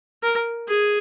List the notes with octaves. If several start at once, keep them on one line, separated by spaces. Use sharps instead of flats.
A#4
G#4